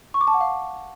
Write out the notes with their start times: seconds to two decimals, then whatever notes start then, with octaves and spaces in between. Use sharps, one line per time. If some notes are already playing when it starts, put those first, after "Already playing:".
0.14 C#6
0.21 D6
0.27 A5
0.34 F#5
0.41 F5